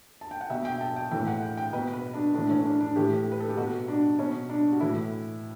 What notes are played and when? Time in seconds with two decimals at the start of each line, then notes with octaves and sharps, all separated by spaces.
0.21 A5
0.31 G5
0.41 F#5
0.50 B2 E5
0.65 G5
0.81 A5
0.96 G5
1.11 A2 E3 G5
1.27 F#5
1.43 G5
1.57 G5
1.73 B2 B4
1.93 B4
2.14 D4
2.34 A2 E3 D4
2.50 C#4
2.61 C#4
2.65 D4
2.80 D4
2.96 A2 E3 G4
3.32 B4
3.40 A4
3.49 G4
3.57 B2 F#4
3.88 D4
4.19 B2 C#4
4.50 D4
4.72 F#4
4.80 A2 E3 E4